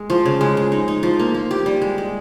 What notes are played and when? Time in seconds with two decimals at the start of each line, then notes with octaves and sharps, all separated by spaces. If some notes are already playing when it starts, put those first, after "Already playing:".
Already playing: G#3
0.10 F3
0.26 C#3
0.41 G#3
0.57 G#3
0.72 D#4
0.88 D#4
1.03 F3
1.19 A#3
1.34 A#3
1.51 G4
1.66 G3
1.82 G#3
1.98 G#3